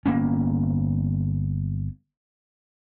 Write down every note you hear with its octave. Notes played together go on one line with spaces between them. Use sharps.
G1 A#3 B3 C#4